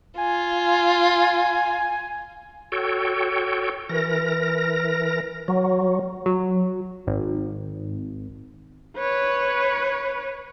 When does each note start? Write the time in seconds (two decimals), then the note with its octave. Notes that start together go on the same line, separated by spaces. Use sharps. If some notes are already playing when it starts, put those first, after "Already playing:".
0.18 F4 G#5
2.72 F#4 A4 C#5 G5
3.89 E3 A#4 A#6
5.48 F#3
6.26 F#3
7.07 G#1
8.98 B4 C#5